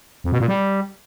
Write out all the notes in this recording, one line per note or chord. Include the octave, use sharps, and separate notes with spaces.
F2
B2
A#2
G3